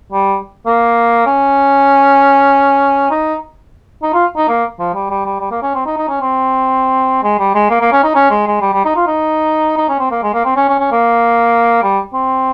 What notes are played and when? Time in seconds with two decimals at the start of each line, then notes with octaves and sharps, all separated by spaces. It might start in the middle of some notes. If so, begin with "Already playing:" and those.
0.12 G3
0.66 A#3
1.26 C#4
3.10 D#4
4.03 D#4
4.14 F4
4.37 D#4
4.48 A#3
4.79 F3
4.94 G3
5.10 G3
5.25 G3
5.40 G3
5.51 A#3
5.62 C#4
5.75 C4
5.86 D#4
5.98 D#4
6.09 C#4
6.21 C4
7.23 G#3
7.39 G3
7.54 G#3
7.70 A#3
7.81 A#3
7.92 C#4
8.04 D#4
8.15 C#4
8.30 G#3
8.47 G#3
8.61 G3
8.73 G3
8.85 D#4
8.96 F4
9.07 D#4
9.78 D#4
9.89 C#4
9.99 C4
10.11 A#3
10.23 G#3
10.34 A#3
10.45 C4
10.56 C#4
10.69 C#4
10.79 C#4
10.92 A#3
11.83 G3
12.13 C4